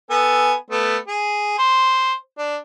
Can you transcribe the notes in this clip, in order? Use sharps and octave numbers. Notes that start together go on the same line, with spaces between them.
B3 A4 G#5
A3 B3
G#4
C5
D4